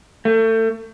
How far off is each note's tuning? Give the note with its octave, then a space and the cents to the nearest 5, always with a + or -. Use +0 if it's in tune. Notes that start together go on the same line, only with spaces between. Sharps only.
A3 +30